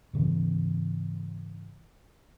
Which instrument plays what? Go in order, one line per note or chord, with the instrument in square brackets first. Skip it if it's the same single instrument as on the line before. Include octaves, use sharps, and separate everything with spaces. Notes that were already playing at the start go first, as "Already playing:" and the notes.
[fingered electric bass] G#2 C#3 E3 B3